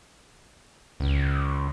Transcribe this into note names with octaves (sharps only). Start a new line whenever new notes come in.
C#2